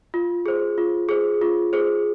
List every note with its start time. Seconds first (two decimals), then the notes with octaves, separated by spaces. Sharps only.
0.14 F4
0.46 G#4 C5
0.78 F4
1.09 G#4 C5
1.42 F4
1.73 G#4 C5